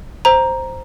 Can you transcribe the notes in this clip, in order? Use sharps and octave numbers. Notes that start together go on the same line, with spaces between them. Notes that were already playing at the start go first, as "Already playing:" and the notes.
C5 A#5